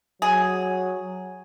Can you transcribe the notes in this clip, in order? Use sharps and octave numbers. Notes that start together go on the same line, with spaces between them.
F#3 G#4